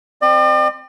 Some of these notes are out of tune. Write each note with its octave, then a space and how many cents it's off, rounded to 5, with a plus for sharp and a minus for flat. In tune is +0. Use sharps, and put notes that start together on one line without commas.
C4 +0 D5 +45